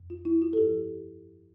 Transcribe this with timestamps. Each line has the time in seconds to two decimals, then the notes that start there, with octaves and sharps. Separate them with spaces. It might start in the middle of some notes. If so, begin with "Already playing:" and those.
Already playing: F2
0.10 F4
0.25 E4
0.42 F4
0.53 A4
0.57 G2 F3 G4